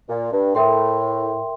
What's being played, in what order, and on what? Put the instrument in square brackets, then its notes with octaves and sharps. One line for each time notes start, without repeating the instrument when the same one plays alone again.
[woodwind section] A#2
G2
[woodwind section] A2 [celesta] A#4 E5 G5 C6